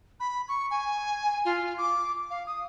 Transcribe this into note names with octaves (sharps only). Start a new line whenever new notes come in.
B5
C#6
G#5
F4
D6
F5
D#6